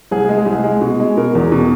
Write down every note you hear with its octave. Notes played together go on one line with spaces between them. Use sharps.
C2 G#4
G#3
G#4
C2
G#3
B2
G#3
B2 A#4
E2
B2